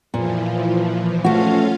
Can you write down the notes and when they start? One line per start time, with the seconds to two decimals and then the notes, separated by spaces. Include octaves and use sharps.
0.14 A#2 E3 F3
1.24 A3 C#4 F4 F#4 F5